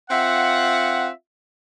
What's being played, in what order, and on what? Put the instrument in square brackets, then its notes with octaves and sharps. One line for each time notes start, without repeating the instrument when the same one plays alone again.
[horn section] C4 F4 E5 F#5